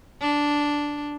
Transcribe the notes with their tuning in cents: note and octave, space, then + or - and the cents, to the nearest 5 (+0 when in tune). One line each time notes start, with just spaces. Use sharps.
D4 -5